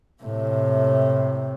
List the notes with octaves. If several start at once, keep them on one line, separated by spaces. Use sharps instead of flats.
A2 C3